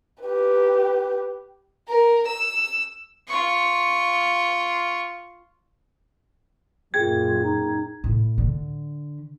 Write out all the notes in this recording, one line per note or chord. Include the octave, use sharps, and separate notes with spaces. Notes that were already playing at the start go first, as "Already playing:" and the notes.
G4 B4
A#4
E6
F4 C#6
F#2 A#2 F4 G#4 G5 G#6
D#4
A2
D3